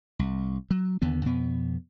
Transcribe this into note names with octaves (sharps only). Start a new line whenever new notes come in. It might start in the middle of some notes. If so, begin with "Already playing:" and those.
C2
F#3
D#2 D3 B3
F2 B2 B3